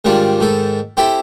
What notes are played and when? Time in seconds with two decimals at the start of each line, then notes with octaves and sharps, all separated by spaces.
0.05 G#2 D#3 G3 D4 F4
0.40 G#2 D#3 A4
0.97 C4 E4 G4 A4